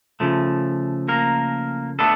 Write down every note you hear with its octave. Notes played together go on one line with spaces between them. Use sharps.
C#3 F3 A3
A#3 A#4
A3 B3 D4 A4